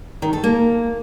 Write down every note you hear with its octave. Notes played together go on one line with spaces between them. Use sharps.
D#3
A4
A#3